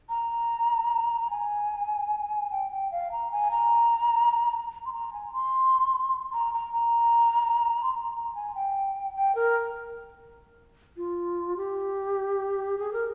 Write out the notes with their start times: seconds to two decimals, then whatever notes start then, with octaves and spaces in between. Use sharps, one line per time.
0.09 A#5
1.30 G#5
2.51 G5
2.71 G5
2.92 F5
3.12 A#5
3.32 G#5
3.52 A#5
4.86 C6
4.93 A#5
5.13 G#5
5.33 C6
6.33 A#5
6.54 A#5
6.73 A#5
7.83 C6
7.94 A#5
8.15 A#5
8.35 G#5
8.55 G5
9.15 G5
9.35 A#4
10.97 F4
11.57 G4
12.78 G#4
12.93 A#4